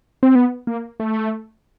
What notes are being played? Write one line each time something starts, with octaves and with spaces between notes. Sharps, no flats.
C4
B3
A#3
A3